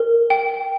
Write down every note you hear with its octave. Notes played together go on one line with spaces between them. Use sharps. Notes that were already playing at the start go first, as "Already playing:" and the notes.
Already playing: A#4
G5